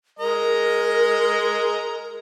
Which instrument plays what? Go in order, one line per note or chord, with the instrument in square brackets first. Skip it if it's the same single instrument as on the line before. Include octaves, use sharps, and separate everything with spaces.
[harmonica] G#3 D#5 A#5 [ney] A#4